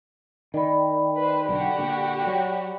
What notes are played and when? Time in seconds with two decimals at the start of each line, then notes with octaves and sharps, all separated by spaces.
0.54 D#3 D5 G5 B5
1.18 B4 C5
1.49 B1 D3 F#4 G4
1.78 A#2 D3
2.27 F#3